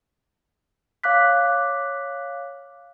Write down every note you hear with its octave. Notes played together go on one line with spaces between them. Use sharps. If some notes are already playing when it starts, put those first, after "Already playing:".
C#5 F5 D6 F#6 B6